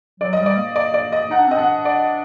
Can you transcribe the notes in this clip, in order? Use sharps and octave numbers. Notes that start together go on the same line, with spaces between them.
F#3 D5
D#5
G3
D5
A#3
D5
D5
D#5
D#4 F#5
D4
C4
D#5
D4 F#5
D5